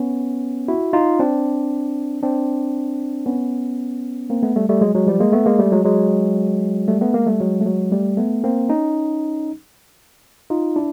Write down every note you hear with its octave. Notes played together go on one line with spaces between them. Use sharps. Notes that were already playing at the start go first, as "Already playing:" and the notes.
Already playing: B3 C#4
E4 F#4
D#4 F4
C4 D4
C4 D4
B3 C#4
A#3 C4
A3 B3
G3 A3
G3 A3
F#3 G#3
F#3 G#3
F3 G3
G#3 A#3
A3 B3
G#3 A#3
G3 A3
F#3 G#3
F#3 G#3
G3 A3
A3 B3
G#3 A#3
G3 A3
F#3 G#3
A3
F#3 G#3
G3 A3
A3 B3
A#3 C4
C#4 D#4
D#4 F4
D4 E4